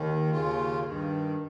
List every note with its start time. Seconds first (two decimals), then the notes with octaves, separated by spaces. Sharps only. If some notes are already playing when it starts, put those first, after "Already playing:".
Already playing: D#2 D#3
0.31 D#2 C#3 F4
0.84 G2 D#3